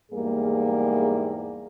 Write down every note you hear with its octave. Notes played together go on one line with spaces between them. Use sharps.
E2 G#2 G3 A#3 G#4